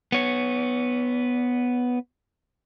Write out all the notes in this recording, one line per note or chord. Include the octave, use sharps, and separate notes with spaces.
B3 C#5